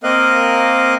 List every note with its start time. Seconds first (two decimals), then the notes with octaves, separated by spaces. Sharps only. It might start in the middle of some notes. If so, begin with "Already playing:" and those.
0.04 A#3 C4 A#4 D#5 F5 F#6